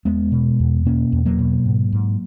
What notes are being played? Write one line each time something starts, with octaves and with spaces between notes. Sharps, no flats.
E2 G#3 B3
B2
E2
B2 A#3 C#4
E2
F#3 A#3
B2
G#2
G#2